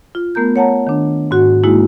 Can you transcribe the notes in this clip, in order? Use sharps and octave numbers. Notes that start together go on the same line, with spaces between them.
F4
A3 B3 A#4 A#5 G6
C#5 F#5 A5 A#5
D#3 D4
G#2 F#4 F#5
G#3 A#3 D#4 E4 F#4 G#4